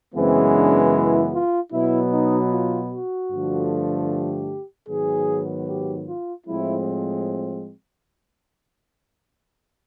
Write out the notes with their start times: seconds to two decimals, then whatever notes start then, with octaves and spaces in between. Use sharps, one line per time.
0.15 F#2 C#3 E3 G#3 B3 C4
0.55 D4
0.94 E4
1.33 F4
1.72 B2 F#3 B3 E4
2.12 D#4
2.52 F4
2.91 F#4
3.31 G2 D3 F3 A3
4.10 G4
4.89 G#2 D#3 F#3 B3 G#4
5.68 G4
6.07 F4
6.47 A2 F3 G#3 C4 E4